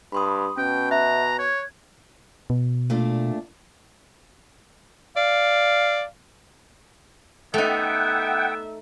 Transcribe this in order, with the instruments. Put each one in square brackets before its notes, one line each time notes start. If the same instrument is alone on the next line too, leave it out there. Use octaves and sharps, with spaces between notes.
[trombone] G2 [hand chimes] B5 C6 D#6
[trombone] B2 [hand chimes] C#4 [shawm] G5
[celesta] E5 [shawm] A#5 [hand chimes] F#6
[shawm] C#5 [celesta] G#6
[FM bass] B2
[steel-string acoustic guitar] A#2 A3 D4
[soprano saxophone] D5 [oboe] F5
[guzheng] A3 D#4 [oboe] B3 [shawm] E5 [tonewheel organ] F#5 G5